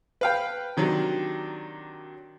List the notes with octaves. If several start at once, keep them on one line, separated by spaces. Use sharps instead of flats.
B4 F5 G5
C3 D#3 F#3 D4